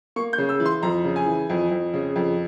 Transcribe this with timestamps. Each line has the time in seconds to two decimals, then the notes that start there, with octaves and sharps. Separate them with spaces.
0.16 A#3 C#6
0.33 G6
0.38 C#3
0.49 E6
0.60 E3
0.66 C6
0.83 F2 A#5
1.04 C#3
1.16 G#5
1.26 E3
1.50 F2
1.71 F2
1.94 C#3
2.16 F2